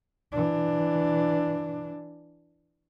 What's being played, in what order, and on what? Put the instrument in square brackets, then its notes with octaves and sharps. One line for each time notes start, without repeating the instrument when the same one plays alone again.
[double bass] E3 D4